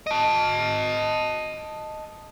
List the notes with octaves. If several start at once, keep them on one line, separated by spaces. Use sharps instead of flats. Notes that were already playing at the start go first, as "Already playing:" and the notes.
D#5 A5